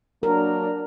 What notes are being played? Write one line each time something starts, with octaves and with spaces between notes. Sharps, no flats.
F#3 A#3 D4 A#4